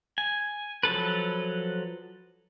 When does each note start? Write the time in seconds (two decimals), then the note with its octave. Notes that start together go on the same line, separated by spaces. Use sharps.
0.18 G#5
0.83 F3 F#3 A4 B4